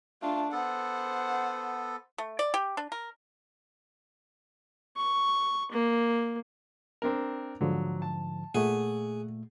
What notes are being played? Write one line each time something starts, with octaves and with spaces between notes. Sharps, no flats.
A3 D4 F4
B3 A4 C5 F#5
A3
D5
G4
D4
A#4
C#6
A#3
C4 D4 A#4
G#2 D3 F3 F#3
A5
A#2 A3 G#4 F#5